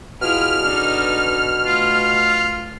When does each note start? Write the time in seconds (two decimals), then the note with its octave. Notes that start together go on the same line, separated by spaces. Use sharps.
0.21 B2 E4 F4 G#4 F6
0.62 D4 D#4 A4
1.66 A3 F4